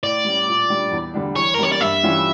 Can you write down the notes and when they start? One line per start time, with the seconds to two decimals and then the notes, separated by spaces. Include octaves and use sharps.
0.03 A2 D5
0.25 G3 C#4
0.48 A#2
0.70 G3 D4
0.91 E2
1.14 D3 G3 D4
1.36 E3 C#5
1.54 A#4
1.59 G3 A#3 C#4 C#5
1.72 D5
1.81 G2 E5
2.03 E3 G3 C#4 F4